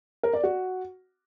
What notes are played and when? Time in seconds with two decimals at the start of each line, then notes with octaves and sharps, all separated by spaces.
0.23 A#4
0.33 D5
0.43 F#4